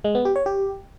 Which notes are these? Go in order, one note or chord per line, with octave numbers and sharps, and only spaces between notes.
G#3
B3
G4
C#5
G4